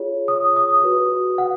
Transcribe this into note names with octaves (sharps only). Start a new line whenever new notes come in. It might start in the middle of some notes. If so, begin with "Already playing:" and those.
Already playing: F4 G#4 C#5
D#6
D#6
F#4 B4
F#5